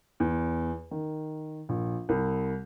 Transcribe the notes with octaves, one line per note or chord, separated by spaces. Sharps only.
E2
D#3
A#1
C2